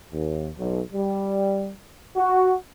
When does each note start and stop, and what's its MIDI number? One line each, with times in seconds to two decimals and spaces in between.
0.12 0.48 39
0.58 0.81 35
0.93 1.71 55
2.15 2.53 66